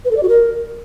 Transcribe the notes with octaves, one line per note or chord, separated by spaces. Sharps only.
B4
A4
D5
F#4
A#4